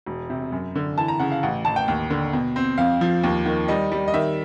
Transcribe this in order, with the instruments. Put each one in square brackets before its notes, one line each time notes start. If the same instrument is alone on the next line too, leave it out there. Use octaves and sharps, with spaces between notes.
[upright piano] E1
C3
F#2
D3
E3 A5
A#5
C#3 F#5
F5
A1 F#5
A1 A5
G5
D#2
D3
B2
C4
F2 F5
F3
D#2
D#3
G3 D#5
G3
D#5
D#3 E5